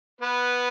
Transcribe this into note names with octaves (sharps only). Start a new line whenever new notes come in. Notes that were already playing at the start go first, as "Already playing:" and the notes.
B3 B4